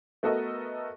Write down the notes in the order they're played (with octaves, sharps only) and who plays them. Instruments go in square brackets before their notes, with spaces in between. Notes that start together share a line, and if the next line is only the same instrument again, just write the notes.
[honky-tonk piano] A3 B3 F#4 A4 A#4 D#5